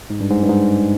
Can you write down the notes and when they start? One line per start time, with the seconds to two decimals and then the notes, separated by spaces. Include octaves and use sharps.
0.10 G#2
0.20 G2
0.30 G#2
0.43 G2
0.50 G#2